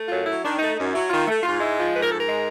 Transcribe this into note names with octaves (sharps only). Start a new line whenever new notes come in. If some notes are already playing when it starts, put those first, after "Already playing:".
Already playing: A3
F#2 F4
F#3 E4
D#3 D4
A3 D#4
F#2 D#4
F#3 E4
D#3 F4
A3
G#2 F4
G#3 E4
F3 F4
G#2 B4
A#4
G#2 A4
A#4
G#3